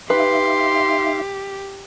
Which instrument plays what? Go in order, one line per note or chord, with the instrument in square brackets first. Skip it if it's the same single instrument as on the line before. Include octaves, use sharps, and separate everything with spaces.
[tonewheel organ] D#4 E5 F5 [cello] G4 [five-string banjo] B4 [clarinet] C6